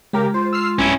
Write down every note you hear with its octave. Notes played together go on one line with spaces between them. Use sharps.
C#3 G#3 G4 A#4
F4 C5
E6 F6 C7
B1 G2 C#4 E4